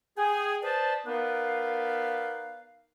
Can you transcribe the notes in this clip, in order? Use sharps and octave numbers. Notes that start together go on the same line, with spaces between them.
G#4 G5 G#5
B4 C5 D5 D#5 A5
B3 D#4 A#4 B4 D5 F5